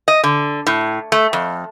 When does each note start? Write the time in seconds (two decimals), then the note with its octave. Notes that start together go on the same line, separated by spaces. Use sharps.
0.08 D#5
0.24 D3
0.67 A2
1.12 A3
1.33 F2